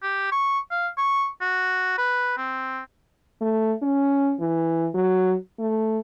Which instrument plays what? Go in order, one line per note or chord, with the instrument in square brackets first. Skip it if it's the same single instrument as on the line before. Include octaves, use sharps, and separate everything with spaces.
[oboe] G4
C#6
F5
C#6
F#4
B4
C4
[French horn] A3
C#4
E3
F#3
A3